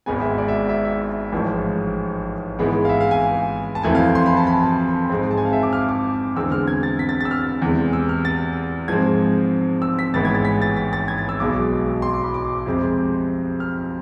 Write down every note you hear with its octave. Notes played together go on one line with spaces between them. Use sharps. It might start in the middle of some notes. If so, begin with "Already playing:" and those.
G#1 G#2 G#3 B3 G#5
E5
D5
E5
E5
E5
A1 G#2 F3
G#2 E3 G#3 B3
F5
E5
F5
G#5
A5
F2 E3 A3 C4 G#5
F5
C6
B5
A5
B5
A5
G#2 G#3 C4
A5
G#5
F5
E5
D6
F6
D6
E2 D3 G#3 C4 E6
F6
G#6
A6
B6
A6
A6
E6
F6
E2 C3 G#3
E6
F6
A6
G#2 F3 G#3 C4 G#6
E6
B6
A1 G#2 E3 B3 A6
G#6
A6
B6
A6
A6
A6
G#6
A6
E6
B1 B2 G#3 D6
C6
D6
B5
D6
F2 C3 G#3 C4
F6